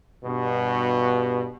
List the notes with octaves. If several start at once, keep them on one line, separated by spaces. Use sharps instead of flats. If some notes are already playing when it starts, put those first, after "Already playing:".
G2 B2